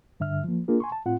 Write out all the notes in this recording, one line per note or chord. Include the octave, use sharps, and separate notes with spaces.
G2 D3 E5 F6
F3 A#3
A#3 D4 F4 G#4 A#4
G#5 C6 C#6
A5
A2 C4 F4 F#5